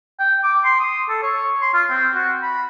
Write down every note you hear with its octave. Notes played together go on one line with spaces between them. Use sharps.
G5
D6
C6
D#6
A4
C#5
C6
F4
C4
F#4
B5